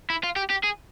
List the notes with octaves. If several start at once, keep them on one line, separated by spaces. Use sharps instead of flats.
E4
F4
G4
G4
G#4